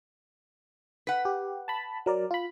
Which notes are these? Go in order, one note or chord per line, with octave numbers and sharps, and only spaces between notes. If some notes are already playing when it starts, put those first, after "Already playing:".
B4 F#5 B6
G4
A5 B5
F#3 A#4 D5
F4 B5